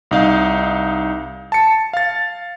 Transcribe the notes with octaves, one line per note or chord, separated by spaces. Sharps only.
C2 D#4 F5
A5 C#7
F5 A6